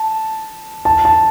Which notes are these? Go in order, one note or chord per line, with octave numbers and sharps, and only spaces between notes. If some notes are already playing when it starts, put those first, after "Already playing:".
Already playing: A5
A5
A5